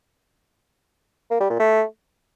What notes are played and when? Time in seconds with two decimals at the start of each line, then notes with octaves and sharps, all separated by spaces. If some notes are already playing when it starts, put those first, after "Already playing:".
1.31 A#3
1.40 G3
1.50 A#2
1.59 A3